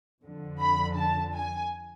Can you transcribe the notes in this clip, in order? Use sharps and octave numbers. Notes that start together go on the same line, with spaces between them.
F2 D3 F3
B5
A5
G#5